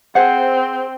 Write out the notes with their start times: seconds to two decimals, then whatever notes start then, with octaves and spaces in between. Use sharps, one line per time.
0.15 C4 G#4 C5 F#5